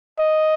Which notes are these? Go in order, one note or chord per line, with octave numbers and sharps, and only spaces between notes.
D#5